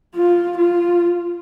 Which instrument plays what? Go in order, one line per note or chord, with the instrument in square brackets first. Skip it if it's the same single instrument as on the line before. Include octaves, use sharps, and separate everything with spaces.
[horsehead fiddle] F4
F4